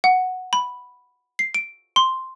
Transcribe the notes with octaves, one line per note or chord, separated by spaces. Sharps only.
F#5
B5
C7
D7
C6